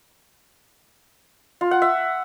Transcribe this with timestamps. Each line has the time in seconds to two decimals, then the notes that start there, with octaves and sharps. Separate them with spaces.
1.61 F4
1.71 F#5
1.82 E5